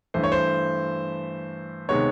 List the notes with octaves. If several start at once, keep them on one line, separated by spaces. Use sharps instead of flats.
G2 E3 A3 C5
C#5
C5
C3 D#3 G#3 B3 C#5